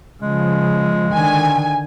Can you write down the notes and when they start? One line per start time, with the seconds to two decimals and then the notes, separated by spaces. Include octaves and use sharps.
0.22 C#3 F3 G#3
1.12 D3 D#3 G#5